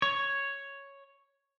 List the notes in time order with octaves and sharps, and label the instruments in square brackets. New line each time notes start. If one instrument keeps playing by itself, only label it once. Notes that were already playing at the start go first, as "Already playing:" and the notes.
[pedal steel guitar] C#5